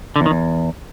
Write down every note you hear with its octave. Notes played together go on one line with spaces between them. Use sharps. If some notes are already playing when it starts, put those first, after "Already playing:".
D3
E2
D#3
E2